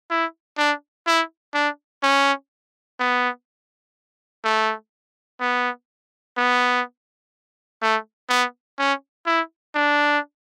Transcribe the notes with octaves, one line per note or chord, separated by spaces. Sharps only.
E4
D4
E4
D4
C#4
B3
A3
B3
B3
A3
B3
C#4
E4
D4